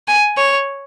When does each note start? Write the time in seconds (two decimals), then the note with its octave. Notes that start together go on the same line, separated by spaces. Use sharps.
0.08 G#5
0.37 C#5